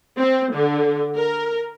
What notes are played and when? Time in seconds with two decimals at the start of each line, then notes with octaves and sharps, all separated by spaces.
0.18 C4
0.54 D3
1.16 A#4